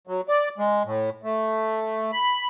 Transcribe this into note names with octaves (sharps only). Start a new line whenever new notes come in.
F#3
D5
G#3
A2
A3
B5